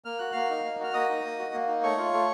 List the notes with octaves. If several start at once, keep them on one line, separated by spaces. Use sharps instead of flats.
A#3 F6
F#4 F#6
A#3 F5 F6
D#4
A#3
F#4 F6
A#3 D#5 D#6
D#4
A#3
F#4
A#3
D#4
A3 C#5 C#6
F4
A3